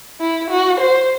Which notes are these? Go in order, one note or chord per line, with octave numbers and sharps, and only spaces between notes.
E4
F#4
C5